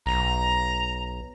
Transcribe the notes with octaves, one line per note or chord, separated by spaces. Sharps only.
B1 A#5